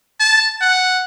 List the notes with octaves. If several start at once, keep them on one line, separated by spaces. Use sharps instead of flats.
A5
F#5